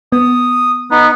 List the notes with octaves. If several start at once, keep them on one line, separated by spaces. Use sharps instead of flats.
B3 D#6
B3 D#4